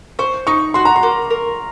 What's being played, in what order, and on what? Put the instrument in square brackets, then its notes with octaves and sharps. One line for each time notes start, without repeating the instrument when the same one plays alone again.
[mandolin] C5 [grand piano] C#6
[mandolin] D#4 [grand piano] C#6
[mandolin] F#4 [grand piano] C6
[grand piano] A#5
C6
[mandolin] A#3
A#4